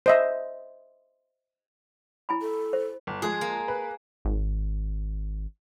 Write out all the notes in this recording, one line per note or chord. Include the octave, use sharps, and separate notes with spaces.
C5 D#5 E5
E4 G#5 B5
A4
C5
G1
F3 G#3 G#4
A#3
B4
G#1